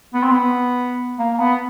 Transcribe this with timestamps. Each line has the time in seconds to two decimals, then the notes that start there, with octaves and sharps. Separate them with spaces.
0.14 B3
0.23 C4
0.32 B3
1.19 A#3
1.34 A#3
1.39 B3